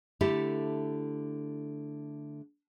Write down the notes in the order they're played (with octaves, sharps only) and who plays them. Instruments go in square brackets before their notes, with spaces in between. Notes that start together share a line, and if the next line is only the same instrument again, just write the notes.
[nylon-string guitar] D3 A3 E4 G4 A4